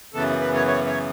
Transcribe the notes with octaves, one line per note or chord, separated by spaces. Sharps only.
F#2 C#3 E3 B3 A4
B4
C#5
C#5
C#5